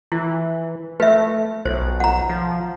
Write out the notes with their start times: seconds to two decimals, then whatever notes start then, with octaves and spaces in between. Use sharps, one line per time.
0.12 E3 E4
1.00 A3 B4 E5
1.65 B1 C5
2.00 F#5 A#5
2.29 F3